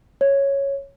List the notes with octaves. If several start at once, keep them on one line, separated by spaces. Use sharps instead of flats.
C#5